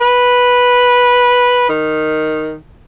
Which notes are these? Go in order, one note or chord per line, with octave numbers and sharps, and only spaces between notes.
B4
D#3